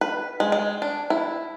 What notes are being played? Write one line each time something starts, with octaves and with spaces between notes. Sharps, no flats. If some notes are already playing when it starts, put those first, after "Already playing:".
B4
G#3
G#3
D4
E4